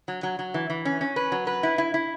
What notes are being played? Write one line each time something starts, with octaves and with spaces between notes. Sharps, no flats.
F#3
F#3
F#3
E3
E3
C#4
C#4
B4
F#3
B4
E4
E4
E4